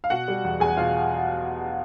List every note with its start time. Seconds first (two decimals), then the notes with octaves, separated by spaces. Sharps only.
0.04 F5
0.10 B2 F#4 F#5
0.28 G3
0.45 E2
0.60 E2 G#4 G#5
0.77 B2 F4 F5